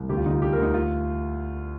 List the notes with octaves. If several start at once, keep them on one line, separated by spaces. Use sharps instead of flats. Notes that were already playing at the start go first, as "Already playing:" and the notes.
Already playing: C2
D2 G4
F4
D3 D#4
F4
D3 G4
A#4
D2 D#4
F4